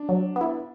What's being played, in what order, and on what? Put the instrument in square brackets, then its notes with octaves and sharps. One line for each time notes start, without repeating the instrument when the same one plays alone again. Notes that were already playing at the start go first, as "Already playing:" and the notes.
Already playing: [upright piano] D4
[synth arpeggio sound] F#3
B3 E4